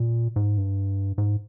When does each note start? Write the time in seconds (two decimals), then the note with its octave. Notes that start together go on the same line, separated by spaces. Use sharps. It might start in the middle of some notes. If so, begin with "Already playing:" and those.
Already playing: A#2
0.36 G#2
0.57 G2
1.18 G#2